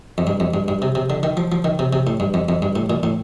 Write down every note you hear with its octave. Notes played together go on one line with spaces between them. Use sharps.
F2
G2
F2
G2
G2
C3
C3
D3
D#3
F3
F3
D#3
C3
C3
A2
G2
F2
F2
G2
A2
A#2
A2